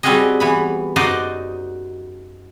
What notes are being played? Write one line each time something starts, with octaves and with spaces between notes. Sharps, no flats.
G3 C4 C#4 F#4 G#4 D#5
E3 B3 B5
F#2 D#4 F#4 C5 D5 D#5